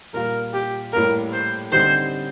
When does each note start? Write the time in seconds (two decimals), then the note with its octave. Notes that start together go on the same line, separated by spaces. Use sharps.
0.14 A#2 G3 A#3 F4 A#4
0.54 G4
0.93 A2 G3 A#3 A#4
1.33 C5
1.72 D3 G3 C4 D#4 G4 C5